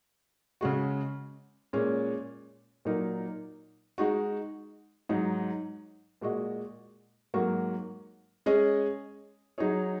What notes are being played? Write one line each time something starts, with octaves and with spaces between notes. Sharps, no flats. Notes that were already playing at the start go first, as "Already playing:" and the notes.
C#3 G#3 F#4
A#2 G#3 C#4
A#2 F#3 D#4 A#4
G#3 D#4 F#4
G#2 F#3 D#4
A#2 G#3 F#4 D#5
G#2 F#3 A#3 F#4
G#3 C#4 G#4 D#5
F#3 D#4 G#4 C#5